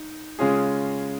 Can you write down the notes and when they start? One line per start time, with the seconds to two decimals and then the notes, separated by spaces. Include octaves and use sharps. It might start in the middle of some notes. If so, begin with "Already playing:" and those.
Already playing: D#4
0.39 C#3 G#3 C#4 F4 G#4